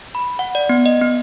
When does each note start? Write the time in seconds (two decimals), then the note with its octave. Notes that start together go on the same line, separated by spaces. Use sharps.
0.15 B5
0.39 F#5
0.55 D5
0.69 B3
0.86 D#5
1.02 B3